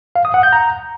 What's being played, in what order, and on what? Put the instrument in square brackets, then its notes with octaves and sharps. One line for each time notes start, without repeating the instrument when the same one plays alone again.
[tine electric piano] F5
D#6
F#5
G6
A#5